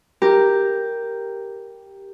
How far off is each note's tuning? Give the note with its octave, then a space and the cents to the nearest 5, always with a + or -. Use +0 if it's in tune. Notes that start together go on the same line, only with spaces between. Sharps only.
G4 +0 A#4 +0